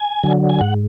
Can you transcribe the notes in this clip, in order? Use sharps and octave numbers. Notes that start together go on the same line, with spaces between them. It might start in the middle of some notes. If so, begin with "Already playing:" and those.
Already playing: G#5
D3 F#3
G#5
G#2 F#5